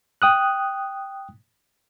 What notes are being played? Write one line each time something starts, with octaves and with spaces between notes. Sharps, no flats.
G5 D#6 F#6